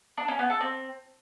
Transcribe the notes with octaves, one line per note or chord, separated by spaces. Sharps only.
D4
C#4
B3
A4
C4